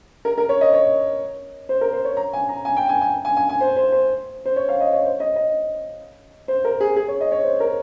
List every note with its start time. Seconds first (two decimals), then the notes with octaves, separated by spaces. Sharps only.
0.25 A#4
0.38 A#4
0.49 C#5
0.61 D#5
0.73 C#5
1.69 C5
1.81 A#4
1.93 C5
2.05 C#5
2.17 A#5
2.33 G#5
2.49 A#5
2.65 G#5
2.77 G5
2.89 G#5
3.01 G#5
3.25 G#5
3.37 G#5
3.49 G#5
3.61 C5
3.77 C5
3.92 C5
4.46 C5
4.56 C#5
4.69 F5
4.80 D#5
4.93 C#5
5.04 C5
5.20 D#5
5.36 D#5
6.48 C5
6.65 A#4
6.80 G#4
6.96 G#4
7.08 C#5
7.21 D#5
7.32 C#5
7.44 C5
7.60 A#4